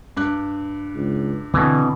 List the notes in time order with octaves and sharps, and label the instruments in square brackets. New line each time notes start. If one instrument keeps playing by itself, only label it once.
[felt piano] G2 D6 F#6
[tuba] C#2
[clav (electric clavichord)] B2 E3 [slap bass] D3 [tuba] C4